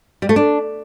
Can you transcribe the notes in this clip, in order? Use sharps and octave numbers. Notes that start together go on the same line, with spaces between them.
G3
A3
D4